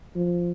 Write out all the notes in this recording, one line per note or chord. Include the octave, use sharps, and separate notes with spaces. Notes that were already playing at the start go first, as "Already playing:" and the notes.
F3